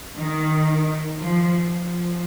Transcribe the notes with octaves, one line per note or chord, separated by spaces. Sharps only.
D#3
F3
F3